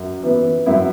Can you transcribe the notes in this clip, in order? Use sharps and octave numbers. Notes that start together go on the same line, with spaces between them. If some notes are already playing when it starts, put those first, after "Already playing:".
Already playing: F#2
E3 B3
F#2 E4